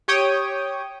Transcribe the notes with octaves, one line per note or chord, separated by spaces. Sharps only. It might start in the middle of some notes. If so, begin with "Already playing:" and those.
G4 C#5 G5 D#6